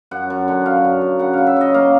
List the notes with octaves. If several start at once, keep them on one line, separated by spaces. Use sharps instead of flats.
F#2 F#5
F#2
D3
F#3 F5
F#2
F#2
C#3 F#5
C#3 F5
E5
F#3 D#5
A#3 F5